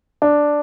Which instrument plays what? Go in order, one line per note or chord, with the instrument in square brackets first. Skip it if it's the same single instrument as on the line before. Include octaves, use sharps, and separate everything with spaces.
[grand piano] D4